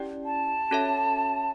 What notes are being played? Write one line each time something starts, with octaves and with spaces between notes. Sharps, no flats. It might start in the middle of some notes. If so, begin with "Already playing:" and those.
Already playing: C#4 E4 G4 D5 G5
A5
C#4 F#4 A4 C#5 E5